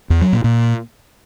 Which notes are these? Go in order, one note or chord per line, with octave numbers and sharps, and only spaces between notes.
E2
F#3
A#2
A#2